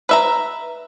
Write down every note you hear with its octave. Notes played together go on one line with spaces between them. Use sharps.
B4 E5 A#5